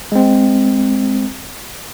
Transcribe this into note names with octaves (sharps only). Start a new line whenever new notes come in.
G#3 C4